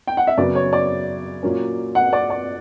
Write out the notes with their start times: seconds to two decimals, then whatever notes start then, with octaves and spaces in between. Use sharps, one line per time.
0.07 G5
0.17 F#5
0.27 E5
0.38 F#2 C#3 F#3 B3 D5
0.55 C#5
0.73 D5
1.43 A#2 F#3 A#3 C#4
1.95 F#5
2.13 D5
2.30 D5